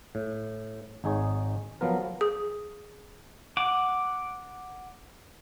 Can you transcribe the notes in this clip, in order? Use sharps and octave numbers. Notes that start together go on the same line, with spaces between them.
A2
G#1 D#4 G#4 C#5
F3 F#3 B3 A#4
G#4
F#5 D6